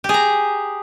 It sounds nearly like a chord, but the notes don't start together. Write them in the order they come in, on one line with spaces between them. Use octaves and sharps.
G4 G#4 A#5